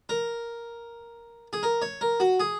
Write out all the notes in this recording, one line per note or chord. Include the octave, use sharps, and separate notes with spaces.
A#4
G#4
A#4
C#5
A#4
F#4
G#4